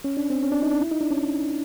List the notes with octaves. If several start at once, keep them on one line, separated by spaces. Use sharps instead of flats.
C#4
D4
C4
C#4
D4
D#4
D4
E4
D#4
D4
C#4